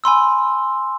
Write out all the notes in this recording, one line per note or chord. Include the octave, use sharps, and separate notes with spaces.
G#5 B5 C6 E6